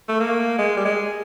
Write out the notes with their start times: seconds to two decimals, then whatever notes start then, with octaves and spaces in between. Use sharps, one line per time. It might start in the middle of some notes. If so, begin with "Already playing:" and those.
0.09 A3
0.20 A#3
0.58 G#3
0.77 G3
0.85 G#3